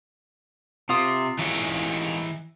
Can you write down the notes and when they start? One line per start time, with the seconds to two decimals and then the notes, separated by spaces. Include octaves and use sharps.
0.89 C3 F4 D#6
1.39 E3 G#3 A#3 D#4 C#5